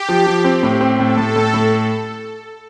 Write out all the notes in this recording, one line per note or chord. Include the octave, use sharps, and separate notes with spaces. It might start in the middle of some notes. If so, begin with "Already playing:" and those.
Already playing: G4
F3
F3
C4
A2
C4
A2 A4
A2
A2
A2